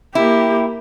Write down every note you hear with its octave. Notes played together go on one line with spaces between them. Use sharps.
A#3 E4 G4